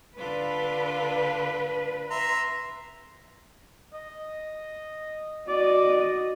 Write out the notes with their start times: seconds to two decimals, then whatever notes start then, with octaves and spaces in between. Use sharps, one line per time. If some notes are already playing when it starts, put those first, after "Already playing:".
0.17 D3 D4 F4 B4
2.10 E5 A#5 C6
3.93 D#5
5.48 F#4 D5 D#5